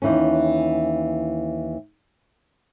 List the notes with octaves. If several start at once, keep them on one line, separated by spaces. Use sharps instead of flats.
D#2 E3 C#4